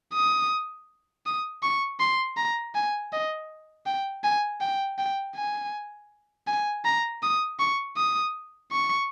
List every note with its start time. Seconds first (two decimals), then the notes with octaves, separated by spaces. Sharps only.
0.14 D#6
1.26 D#6
1.63 C#6
2.00 C6
2.37 A#5
2.75 G#5
3.12 D#5
3.86 G5
4.23 G#5
4.61 G5
4.98 G5
5.36 G#5
6.47 G#5
6.85 A#5
7.23 D#6
7.59 C#6
7.97 D#6
8.71 C#6